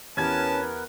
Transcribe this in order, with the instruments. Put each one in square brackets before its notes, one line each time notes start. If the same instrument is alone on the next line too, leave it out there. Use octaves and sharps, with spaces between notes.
[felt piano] E2 G4 G#6 [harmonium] B3 A#4 B4 [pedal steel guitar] C#4 [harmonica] A5